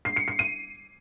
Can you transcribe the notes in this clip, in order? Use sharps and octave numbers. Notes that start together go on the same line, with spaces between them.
C7
C#7
C7
D#7